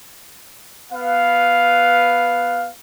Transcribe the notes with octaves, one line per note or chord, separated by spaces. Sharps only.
B3 B4 F5